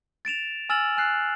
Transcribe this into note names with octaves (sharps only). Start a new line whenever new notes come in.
A6 D7 E7 F7
G#5 E6 F6 A6 E7 F#7
G#5 F6 F#6 C7